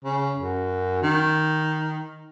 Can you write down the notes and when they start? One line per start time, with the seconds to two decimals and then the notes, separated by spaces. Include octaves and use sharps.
0.05 C#3
0.38 F#2
1.03 D#3